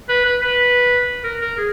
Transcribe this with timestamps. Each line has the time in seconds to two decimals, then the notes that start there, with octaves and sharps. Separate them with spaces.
0.09 B4
0.25 B4
0.41 B4
1.24 A#4
1.41 A#4
1.58 G#4